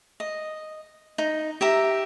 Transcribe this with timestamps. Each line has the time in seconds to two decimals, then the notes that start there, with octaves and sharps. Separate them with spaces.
0.20 D#5
1.18 D#4
1.61 G4 E5 A#5